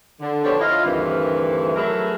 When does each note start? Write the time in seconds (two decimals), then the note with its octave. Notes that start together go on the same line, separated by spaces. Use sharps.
0.20 D3
0.44 D3 F3 B3 D4 G4 C#5
0.60 E4 F4 D#5 F5
0.84 D2 G2 C3 D#3 E3
1.76 F#3 A3 G#4 A#4 B4 E5